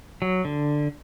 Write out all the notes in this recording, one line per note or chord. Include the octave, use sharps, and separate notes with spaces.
F#3
D3